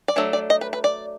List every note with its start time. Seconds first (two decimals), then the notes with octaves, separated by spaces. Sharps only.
0.08 D5
0.16 F#3 A3 D4 C#5
0.33 D5
0.50 D#5
0.61 B4
0.73 B4
0.84 D5